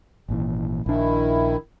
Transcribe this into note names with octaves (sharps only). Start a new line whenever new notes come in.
G#1 A#2 E3
A#1 D#3 D4 E4